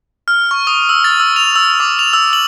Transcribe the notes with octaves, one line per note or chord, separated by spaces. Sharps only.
F6
C#6
D#6
E6
A6
E6
F7
E6
D6
F7
E6
F#7